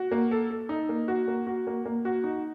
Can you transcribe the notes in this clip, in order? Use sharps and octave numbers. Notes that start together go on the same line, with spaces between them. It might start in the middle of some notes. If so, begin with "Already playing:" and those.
Already playing: F#4
A#3
A4
A4
D#4
A#3
F#4
A#3
F#4
A#3
A#3
F#4
D#4